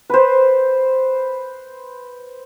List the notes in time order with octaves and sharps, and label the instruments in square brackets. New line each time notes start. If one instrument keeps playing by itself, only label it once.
[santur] B4 C5